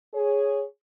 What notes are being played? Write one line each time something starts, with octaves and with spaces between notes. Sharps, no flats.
G#4 C#5